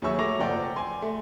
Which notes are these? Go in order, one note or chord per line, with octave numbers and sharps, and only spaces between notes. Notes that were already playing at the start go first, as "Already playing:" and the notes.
D#2 F#3 G#4 E5 C#6 E6
F#3 A3 D6 A#6 F7
F#1 F3 D5 F#5 G5
G#5 C6
A3